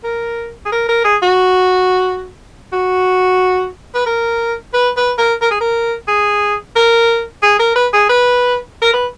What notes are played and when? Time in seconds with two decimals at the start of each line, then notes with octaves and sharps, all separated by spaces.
0.04 A#4
0.65 G#4
0.72 A#4
0.89 A#4
1.04 G#4
1.22 F#4
2.73 F#4
3.95 B4
4.06 A#4
4.74 B4
4.97 B4
5.18 A#4
5.41 A#4
5.51 G#4
5.60 A#4
6.08 G#4
6.76 A#4
7.43 G#4
7.59 A#4
7.75 B4
7.93 G#4
8.09 B4
8.82 A#4
8.94 B4